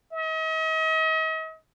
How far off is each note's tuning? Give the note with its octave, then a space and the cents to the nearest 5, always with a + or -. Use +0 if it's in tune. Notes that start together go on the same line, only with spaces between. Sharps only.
D#5 +40